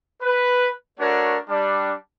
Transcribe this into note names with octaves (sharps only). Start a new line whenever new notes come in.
B4
A3 D4 F#4 A#4 C#5
G3 D4